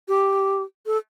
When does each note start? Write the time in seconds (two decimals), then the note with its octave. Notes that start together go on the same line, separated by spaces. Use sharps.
0.08 G4
0.86 A4